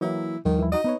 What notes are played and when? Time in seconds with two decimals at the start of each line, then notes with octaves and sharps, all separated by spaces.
0.01 E3 F#3 A#3 E4
0.45 D#2 D#3 F3 G3
0.59 E3 E4
0.72 D#4 F#4 D#5 D#6
0.84 B3 D#4 B4 C#5